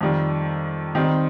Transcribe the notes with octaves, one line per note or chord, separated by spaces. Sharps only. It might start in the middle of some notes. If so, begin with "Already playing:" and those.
F2 D#3 G3
D#3 G3 C4 D#4